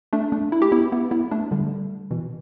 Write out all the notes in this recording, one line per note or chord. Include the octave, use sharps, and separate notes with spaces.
A3 D4
A3 D4
E4
G4
B3 E4
B3 E4
B3 E4
A3 D4
D3 G3
B2 E3